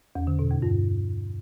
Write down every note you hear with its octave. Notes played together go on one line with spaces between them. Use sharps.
E2
D3
B2
F2
G2